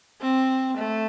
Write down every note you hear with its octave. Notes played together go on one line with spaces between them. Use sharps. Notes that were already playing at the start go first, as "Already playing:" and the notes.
C4
A3